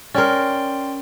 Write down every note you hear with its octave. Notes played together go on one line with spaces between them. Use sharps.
C#4 A#4 D5 G5 C6